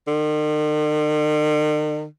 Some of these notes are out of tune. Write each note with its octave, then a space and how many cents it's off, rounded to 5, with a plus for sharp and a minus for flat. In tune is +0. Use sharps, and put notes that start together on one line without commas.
D#3 -45